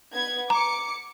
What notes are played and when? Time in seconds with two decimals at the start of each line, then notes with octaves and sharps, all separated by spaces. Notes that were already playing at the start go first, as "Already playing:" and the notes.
0.12 B3 G#6
0.50 A#5 D6 C#7